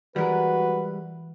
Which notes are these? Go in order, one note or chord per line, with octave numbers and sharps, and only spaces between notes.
E3 G3 G#3 F#4 A#4 B4 B5 F#6